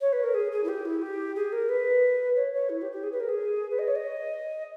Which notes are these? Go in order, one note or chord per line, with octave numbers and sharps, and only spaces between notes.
C#5
B4
A#4
G#4
G#4
E4
G4
E4
G4
G#4
A#4
B4
C#5
C#5
E4
G4
G4
G#4
B4
A#4
G#4
B4
D#5
C#5
D#5